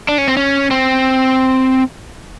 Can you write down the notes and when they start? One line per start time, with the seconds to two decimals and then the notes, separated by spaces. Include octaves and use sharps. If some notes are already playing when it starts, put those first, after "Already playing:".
0.08 D4
0.18 C#4
0.28 C4
0.37 C#4
0.71 C4